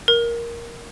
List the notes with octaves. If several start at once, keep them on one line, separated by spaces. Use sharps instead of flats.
A#4